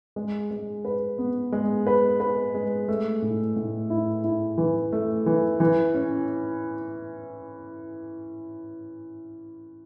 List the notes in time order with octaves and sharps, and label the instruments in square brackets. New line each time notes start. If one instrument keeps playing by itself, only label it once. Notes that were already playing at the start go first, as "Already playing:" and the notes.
[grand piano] G#3
G#3
B4
B3
G#3
B4
B4
G#3
A3
A2
A2
E4
E4
E3
A3
E3
E3
C#4